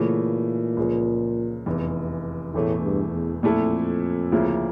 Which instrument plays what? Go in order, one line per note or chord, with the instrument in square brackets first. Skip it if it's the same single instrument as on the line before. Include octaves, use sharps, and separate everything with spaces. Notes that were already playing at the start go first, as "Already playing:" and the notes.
Already playing: [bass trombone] A#2 [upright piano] C#3 E3 A3
[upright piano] C#2 C#3 F3
F1 E2 E3
[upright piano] E1 E2 E3 A3 [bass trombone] A2
[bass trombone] G2
E2
[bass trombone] F2 [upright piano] A#2 A3 E4 A4
[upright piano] D2 C#3 F3 A#3 E4